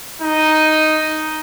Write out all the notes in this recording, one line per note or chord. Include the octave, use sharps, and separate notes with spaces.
D#4